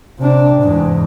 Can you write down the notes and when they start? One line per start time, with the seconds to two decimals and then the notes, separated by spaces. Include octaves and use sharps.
0.18 C3 D4
0.62 E2 G#2